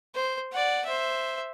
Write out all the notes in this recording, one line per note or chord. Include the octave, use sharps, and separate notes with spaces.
C5
D5 F#5
C5 E5